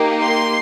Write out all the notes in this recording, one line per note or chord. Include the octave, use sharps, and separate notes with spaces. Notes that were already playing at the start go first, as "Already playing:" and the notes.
Already playing: A#3 D#4 G4
C6